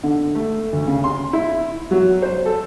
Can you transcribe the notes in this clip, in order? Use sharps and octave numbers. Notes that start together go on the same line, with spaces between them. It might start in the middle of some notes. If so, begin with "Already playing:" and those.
D3
A3
D2
C#3
C6
E4
F#3
C5
A4